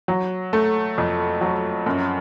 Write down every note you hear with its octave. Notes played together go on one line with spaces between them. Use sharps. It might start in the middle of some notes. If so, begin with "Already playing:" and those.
F#3
A3
F2
F#3
F#2